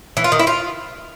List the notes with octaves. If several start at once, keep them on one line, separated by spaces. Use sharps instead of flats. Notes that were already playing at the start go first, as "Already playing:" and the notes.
E3
F4
D#3
E4
F4